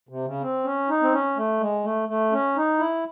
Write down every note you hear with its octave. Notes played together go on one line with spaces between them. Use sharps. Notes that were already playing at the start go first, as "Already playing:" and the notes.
C3
C#3
C4
C#4
D#4
C4
C#4
A3
G#3
A3
A3
C#4
D#4
E4